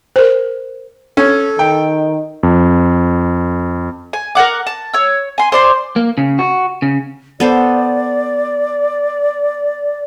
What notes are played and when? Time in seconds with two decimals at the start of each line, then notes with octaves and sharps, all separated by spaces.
0.16 A#4 C5
1.17 C#4 A4
1.59 D#3 G5
2.43 F2
4.13 G#5
4.35 A#4 D5 F#5 D6
4.67 A5
4.94 C#5 E6
5.38 G#5 C6
5.52 C5 D5 C6
5.96 A#3
6.18 C#3
6.39 F#4
6.82 C#3
7.40 B3 A4 C5 D5